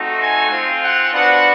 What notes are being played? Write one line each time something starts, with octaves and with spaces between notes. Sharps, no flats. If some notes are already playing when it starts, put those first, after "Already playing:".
Already playing: A3 C4 D#4 F#4
G#5
C4 F4
F#5
B3 D4 F#4 F#5